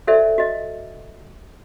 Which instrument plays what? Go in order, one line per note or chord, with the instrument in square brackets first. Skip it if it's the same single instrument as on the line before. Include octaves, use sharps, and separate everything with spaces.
[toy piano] F#4 A4 C5 D5 E5
F#4 D#5